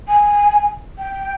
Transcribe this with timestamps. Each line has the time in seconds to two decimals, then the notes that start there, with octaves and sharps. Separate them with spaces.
0.07 G#5
0.98 G5